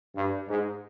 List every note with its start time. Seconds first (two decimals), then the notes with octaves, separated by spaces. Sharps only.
0.16 G2
0.48 G#2